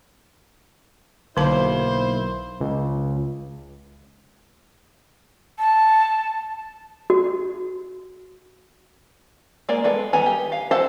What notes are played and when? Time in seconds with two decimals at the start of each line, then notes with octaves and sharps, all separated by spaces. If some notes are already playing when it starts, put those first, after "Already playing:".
1.37 B1 D3 A#3 E4 C5 A5
2.61 C#2
5.58 A5
7.10 F#4
9.69 G#3 A#3 G#4 D5
9.84 G#3 B3 A4
10.13 D#3 G3 B3 G#5 A#5
10.26 G4
10.52 F5
10.71 A4 C5 F5 F#5 A5